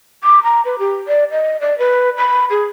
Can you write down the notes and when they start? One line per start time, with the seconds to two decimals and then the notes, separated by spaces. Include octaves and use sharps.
0.24 D6
0.44 A#5
0.65 B4
0.79 G4
1.08 D5
1.31 D#5
1.61 D5
1.79 B4
2.18 B5
2.50 G#4